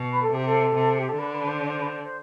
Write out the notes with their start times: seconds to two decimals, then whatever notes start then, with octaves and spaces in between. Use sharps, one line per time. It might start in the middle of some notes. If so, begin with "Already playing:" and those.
Already playing: B2
0.10 B4
0.22 A4
0.32 C3 G4
0.45 A4
0.75 C3
0.98 G4
1.09 A4
1.18 D3 B4
1.32 B4
1.47 C5
1.64 D5
1.69 C5
1.81 B4
1.86 C5
2.04 C5